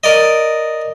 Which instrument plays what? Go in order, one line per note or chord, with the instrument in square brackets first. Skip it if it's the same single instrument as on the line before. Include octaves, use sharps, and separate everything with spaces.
[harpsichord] A#4 D5 D#5